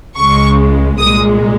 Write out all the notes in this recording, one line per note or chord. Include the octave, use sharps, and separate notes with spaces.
C#2 C#3 G#3 C#6
C2 A#2 G#3 D#6